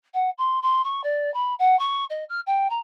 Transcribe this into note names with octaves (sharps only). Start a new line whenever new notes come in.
F#5
C6
C6
C#6
D5
B5
F#5
C#6
D#5
F6
G5
A#5